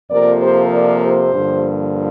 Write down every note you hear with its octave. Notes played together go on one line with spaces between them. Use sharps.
F2 C3 F3 A#3 A#4 D5
G4 C5
A#4 D5
G4 C5
G2 D3 F3 A#3